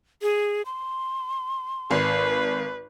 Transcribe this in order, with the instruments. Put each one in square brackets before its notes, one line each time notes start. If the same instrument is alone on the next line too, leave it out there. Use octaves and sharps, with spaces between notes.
[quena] G#4
C6
[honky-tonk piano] G#1 [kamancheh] B4